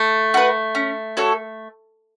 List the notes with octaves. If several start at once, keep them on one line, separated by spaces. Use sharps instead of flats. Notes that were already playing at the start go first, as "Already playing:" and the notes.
Already playing: A3
F#4 B4
C#4
F#4 A4 C#5